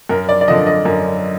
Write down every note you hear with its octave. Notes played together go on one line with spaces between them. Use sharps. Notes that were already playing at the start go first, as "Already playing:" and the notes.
F#2 A#4
D5
D5
D3 F3 D#5
D#5
F#2